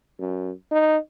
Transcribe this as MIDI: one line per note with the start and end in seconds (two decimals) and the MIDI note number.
0.19 0.51 42
0.71 0.97 63